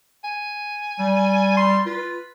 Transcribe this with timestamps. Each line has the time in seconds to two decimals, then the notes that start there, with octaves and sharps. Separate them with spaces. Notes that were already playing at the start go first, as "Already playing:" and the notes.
0.24 G#5
0.99 G3
1.57 C6
1.86 F4 B4